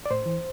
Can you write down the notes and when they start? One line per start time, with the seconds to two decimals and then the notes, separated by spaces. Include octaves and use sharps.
0.06 D5
0.10 A2 C5
0.26 E3